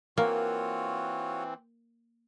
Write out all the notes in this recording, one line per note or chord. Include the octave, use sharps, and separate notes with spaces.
E3 A#3 C4 F4 F#4 C#5